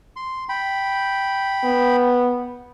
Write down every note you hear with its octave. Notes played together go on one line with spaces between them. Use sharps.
C6
G5 B5
B3